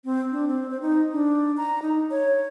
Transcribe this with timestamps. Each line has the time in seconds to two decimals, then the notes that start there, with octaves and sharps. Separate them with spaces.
0.05 C4
0.32 D4
0.48 C4
0.71 C5
0.82 D#4
1.12 D4
1.57 A#5
1.82 D#4
2.11 C#5